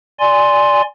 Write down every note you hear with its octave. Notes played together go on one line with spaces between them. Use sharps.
D5 G#5 C6